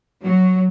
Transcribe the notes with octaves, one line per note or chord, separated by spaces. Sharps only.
F#3